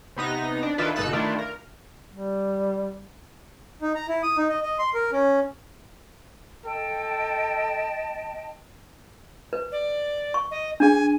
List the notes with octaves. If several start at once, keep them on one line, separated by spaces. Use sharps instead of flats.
C3 B3 D#4 A#6
D4
D#3 D4 E4 F4 A4 B4
G1 B2 D#4 A4 E6 F#6
D#3 A3 D4 E4 F4
A#4
G3
D#4
A#5
E4
D#6
D#4
D#5
D#5
C6
A#4
C#4
A4 D#5 G5 A5
B4
D5
C#6
D#5
D4 G#4 G#5